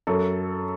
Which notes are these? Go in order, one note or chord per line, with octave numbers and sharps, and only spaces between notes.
F#2 A4